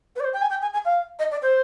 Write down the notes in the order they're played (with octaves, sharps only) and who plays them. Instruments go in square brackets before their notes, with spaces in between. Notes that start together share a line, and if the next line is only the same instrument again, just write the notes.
[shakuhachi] B4
D5
C5
G5
G#5
G5
G#5
G#5
F5
D#5
D5
C5